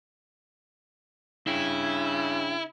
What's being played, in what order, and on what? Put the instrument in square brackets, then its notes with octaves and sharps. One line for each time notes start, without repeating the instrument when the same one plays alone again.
[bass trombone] C#3 [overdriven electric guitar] D4 G5 [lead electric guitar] E4